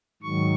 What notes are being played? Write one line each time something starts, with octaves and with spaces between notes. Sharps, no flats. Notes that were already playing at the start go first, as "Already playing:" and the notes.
G#2 D#3 F#3 C#6